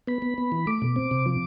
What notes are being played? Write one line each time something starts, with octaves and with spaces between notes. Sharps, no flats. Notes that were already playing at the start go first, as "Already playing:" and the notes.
B3 B5
B3
B3
E3
A3 D6
B2
C4
C3
F3